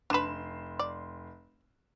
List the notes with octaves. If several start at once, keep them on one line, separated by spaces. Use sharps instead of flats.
F1 D4 B4 C6 E7
D5